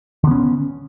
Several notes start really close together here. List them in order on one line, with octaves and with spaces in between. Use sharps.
D3 B3 C#4